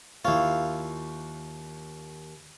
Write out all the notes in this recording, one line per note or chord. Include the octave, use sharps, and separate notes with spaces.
D#2 E4 F4 C#5